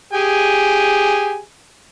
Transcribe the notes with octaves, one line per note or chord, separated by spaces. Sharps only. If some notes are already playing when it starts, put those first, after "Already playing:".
G4 G#4 G#5